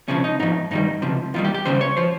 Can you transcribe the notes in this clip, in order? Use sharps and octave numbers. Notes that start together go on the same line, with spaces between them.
C#2 C3 F3 C#4
D#4
G#2 F3 D#4
G2 D#3 G3 D#4
C#2 C3 F3
D#2 D#3 G3 F4
G4
G4
D#2 C#3 G3 C5
C#5
F3 C5